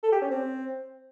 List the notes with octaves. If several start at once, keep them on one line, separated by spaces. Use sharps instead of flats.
A4
G4
C#4
C4